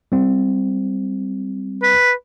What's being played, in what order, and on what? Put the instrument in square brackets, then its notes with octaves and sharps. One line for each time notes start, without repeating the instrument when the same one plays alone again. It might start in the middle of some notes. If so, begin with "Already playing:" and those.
[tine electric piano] G3 C4
[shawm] B4